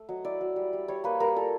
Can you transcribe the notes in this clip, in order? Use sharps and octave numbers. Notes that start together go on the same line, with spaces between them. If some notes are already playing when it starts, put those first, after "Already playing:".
Already playing: A3
F#3 D#5
E4 D5
F#3
G3
G3
G3 C#5
A#3 B4
G3 A#4
F4 A4